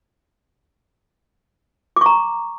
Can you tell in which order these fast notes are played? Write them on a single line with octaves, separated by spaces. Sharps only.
D6 C#6 A#5